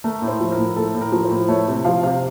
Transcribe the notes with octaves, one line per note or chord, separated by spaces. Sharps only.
A3 A#4
A2
C5
F3
A#4
A2
A3 A4
A2
A#4
F3
C5
A2
A3 C#5
C3
F3 F5
C3 F5